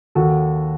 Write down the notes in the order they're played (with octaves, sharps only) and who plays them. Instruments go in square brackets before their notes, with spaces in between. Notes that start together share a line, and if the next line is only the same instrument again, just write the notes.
[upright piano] D#2 F#4 A4